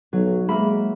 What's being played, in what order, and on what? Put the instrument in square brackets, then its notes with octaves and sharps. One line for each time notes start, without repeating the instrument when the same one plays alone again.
[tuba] B1 [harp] F#3
[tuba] G#3 [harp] A#3 E5 B5